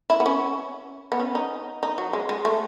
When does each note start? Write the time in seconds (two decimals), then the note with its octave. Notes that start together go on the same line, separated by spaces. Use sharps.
0.10 E4
0.20 B3
0.26 C#4
1.12 B3
1.20 C#4
1.35 D#4
1.83 D#4
1.98 F#3
2.13 G#3
2.29 G#3
2.45 A3